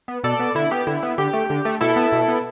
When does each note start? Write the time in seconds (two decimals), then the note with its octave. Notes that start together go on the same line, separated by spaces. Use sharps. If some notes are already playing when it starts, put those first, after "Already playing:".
0.08 B3
0.24 B2 A4 D5
0.39 B3
0.55 D3 E4
0.71 B3 G4
0.87 D3 E4
1.03 B3
1.18 D3 G4
1.33 A3
1.50 D3
1.65 A3
1.81 B2 E4 A4
1.96 B3
2.12 B2
2.28 B3